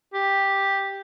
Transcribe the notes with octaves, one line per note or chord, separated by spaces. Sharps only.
G4